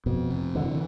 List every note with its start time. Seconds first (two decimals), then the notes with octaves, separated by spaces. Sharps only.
0.06 F2 B2
0.30 C3
0.55 D3 E3